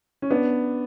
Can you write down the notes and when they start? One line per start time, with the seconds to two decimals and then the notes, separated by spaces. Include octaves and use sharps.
0.22 C#4
0.30 B3 D4